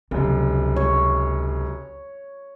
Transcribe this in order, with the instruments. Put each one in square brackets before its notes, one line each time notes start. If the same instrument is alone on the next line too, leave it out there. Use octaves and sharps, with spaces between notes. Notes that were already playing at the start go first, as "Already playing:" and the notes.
[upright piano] F1 F#2 [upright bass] C#2
[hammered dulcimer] C#5